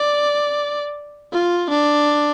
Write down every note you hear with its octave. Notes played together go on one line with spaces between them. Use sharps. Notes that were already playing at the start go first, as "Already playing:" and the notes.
Already playing: D5
F4
D4